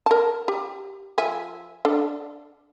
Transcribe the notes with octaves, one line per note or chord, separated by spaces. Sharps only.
A#4 A5
G4
F3 E5 G#5
D4 A4